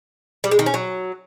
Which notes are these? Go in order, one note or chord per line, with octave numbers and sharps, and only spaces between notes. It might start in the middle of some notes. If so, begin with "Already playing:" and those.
G3
G#3
D#3
C#4
F#3